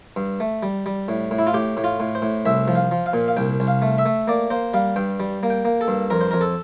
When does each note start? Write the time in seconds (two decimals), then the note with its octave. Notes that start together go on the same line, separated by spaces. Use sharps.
0.16 G2
0.40 A3
0.63 G3
0.86 G3
1.08 A2
1.31 A2
1.39 E4
1.47 F4
1.54 A2 G4
1.77 A2
1.84 F4
2.00 A2
2.15 C5
2.22 A2
2.46 C2 E5
2.68 F3
2.75 F5
2.91 F3
3.06 F5
3.13 A#2
3.28 F5
3.37 C2 G5
3.60 C2
3.67 F5
3.82 A3
3.98 E5
4.06 A3
4.28 A#3 D5
4.50 A#3 C5
4.74 G3 F5
4.96 G2 G5
5.20 G3
5.43 A#3
5.50 G5
5.65 A#3
5.81 A4
5.88 G2
6.10 F2 A#4
6.21 C5
6.31 F2 A#4
6.41 A4